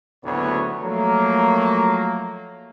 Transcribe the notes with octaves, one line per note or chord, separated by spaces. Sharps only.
F#1 D2 A2 B3 C#5
F3 F#3 A3 A#3